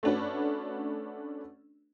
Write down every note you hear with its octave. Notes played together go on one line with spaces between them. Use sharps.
A3 C#4 D4 F#4 B4